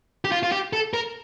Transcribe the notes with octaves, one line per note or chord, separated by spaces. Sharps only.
G4
F4
F4
G4
A4
A#4